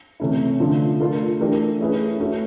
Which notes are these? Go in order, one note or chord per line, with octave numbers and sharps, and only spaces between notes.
C3 E3 A3 C#4 E4
D3 F3 A3
A3 D4 F4 A#4
E3 A3 D4 G4 A#4
A3 C#4 E4 G#4 B4
A3 C#4 F#4